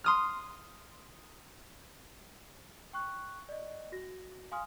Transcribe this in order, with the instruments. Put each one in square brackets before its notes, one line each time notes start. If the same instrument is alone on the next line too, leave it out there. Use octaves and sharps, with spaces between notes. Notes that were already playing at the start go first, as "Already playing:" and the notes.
[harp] C6 D#6 F6
[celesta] G5 C#6 F#6
D5 D#5
F#4 A#6
F5 G#5 C6 D#6 F6